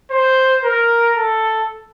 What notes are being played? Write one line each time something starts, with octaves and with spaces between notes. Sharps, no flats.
C5
A#4
A4